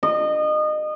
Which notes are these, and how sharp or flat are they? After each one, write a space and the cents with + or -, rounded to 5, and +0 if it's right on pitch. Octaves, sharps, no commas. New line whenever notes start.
D#5 -30